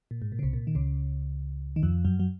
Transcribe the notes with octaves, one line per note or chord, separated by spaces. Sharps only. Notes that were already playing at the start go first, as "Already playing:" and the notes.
A#2
G#2
A#2
C#3
C2 C3
A#2
D#3
C#2 C#3
D#3
F2 F3
F#2 F#3
F#3